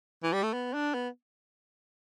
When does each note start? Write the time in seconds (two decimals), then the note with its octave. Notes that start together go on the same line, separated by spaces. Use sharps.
0.24 E3
0.33 G3
0.43 A3
0.53 B3
0.74 D4
0.94 B3